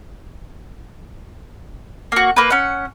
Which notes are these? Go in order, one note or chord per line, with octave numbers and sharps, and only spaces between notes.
A#3 F#4
A#3 B4
C#4 F#5